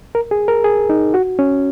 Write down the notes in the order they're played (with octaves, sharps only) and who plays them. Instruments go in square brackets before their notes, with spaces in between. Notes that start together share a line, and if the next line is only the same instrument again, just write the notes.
[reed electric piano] A#4
G#4
A#4
G#4
D#4
F#4
C#4